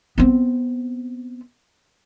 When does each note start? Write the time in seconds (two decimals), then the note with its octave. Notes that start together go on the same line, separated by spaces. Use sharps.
0.18 B3 C4